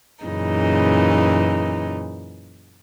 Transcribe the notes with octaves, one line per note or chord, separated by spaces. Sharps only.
F#2 A#2 C#3 E3 D#4